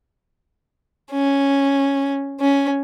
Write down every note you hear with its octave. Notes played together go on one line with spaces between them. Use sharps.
C#4
C#4